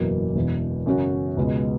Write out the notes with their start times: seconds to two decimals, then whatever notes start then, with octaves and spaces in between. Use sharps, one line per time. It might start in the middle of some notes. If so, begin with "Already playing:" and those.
Already playing: F#1 E2 B2 F#3 A#3
0.35 E1 E2 B2
0.86 F#2 C#3 F#3 C#4 F#4
1.37 C#2 B2 G#3